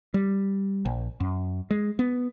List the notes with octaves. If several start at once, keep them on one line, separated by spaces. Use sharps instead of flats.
G3
A#1
F#2
G#3
B3